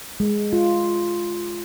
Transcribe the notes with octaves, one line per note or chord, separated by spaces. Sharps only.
G#3
F4